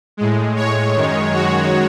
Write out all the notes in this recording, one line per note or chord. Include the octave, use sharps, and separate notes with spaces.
A2 G#3
C#5
F#2 D#3 G#3
F#4